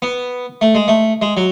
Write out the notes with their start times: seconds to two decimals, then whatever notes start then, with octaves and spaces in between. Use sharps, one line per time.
0.02 B3
0.61 A3
0.75 G#3
0.88 A3
1.22 G#3
1.37 F#3